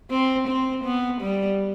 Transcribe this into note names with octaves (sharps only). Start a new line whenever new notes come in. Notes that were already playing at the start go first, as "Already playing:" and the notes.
C4
C4
B3
G3